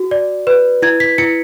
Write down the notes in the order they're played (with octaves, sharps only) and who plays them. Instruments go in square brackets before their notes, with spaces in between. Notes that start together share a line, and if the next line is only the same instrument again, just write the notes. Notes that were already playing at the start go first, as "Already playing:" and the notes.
Already playing: [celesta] F#4
D5
B4
E4 G#6
B6
E4 C#7